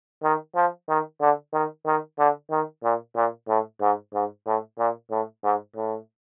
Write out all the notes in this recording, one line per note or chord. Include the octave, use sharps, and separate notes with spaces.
D#3
F3
D#3
D3
D#3
D#3
D3
D#3
A#2
A#2
A2
G#2
G#2
A2
A#2
A2
G#2
A2